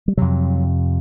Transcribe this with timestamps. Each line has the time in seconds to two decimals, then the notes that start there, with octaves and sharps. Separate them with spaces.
0.08 G3
0.17 F2 C3 F#3